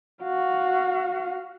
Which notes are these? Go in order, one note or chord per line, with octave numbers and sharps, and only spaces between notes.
F#4 F5